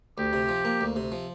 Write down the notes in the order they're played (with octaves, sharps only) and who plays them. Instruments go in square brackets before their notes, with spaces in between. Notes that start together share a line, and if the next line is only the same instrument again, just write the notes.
[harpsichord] D2 [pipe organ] G4
[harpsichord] C3
F3
A#3
D2
C3
F3